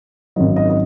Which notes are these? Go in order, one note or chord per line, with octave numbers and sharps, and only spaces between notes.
G#1 F#2 D#3 F#3 D#5
D#5
D#5